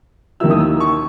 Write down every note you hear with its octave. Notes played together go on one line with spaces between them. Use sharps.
D#2 D#3 A#3 E4 E6
D#6
E6
C#6